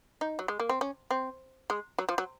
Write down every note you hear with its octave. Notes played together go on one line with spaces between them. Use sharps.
D#4
F#3
G#3
A#3
C4
C#4
C4
G#3
F#3
F3
F#3